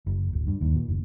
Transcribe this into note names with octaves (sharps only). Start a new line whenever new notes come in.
F#1
D1
G2
D#2
A#2
F#1